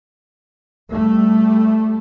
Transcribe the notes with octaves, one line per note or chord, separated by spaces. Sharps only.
G3 A3